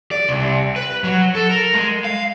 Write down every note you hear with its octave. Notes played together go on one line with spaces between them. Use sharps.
D5
C2
B4
F#3
A4
A#4
G#3
F5